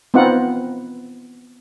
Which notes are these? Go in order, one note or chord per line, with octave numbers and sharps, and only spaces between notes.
B3 C4 D#4 F4 F#5